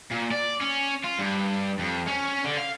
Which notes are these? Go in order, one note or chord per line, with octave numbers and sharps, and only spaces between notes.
A#2
D5
C#4
F4
G2
F2
C#4
D3
F5